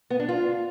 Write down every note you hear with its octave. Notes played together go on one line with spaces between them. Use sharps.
B3
D4
F4